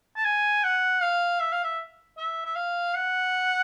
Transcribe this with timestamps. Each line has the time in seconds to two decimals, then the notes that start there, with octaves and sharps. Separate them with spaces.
0.16 A5
0.25 G#5
0.64 F#5
1.02 F5
1.40 E5
1.53 F5
1.64 E5
2.18 E5
2.45 E5
2.56 F5
2.95 F#5